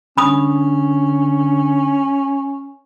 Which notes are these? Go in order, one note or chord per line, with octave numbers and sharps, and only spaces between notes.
D3 C#4 B5 D#6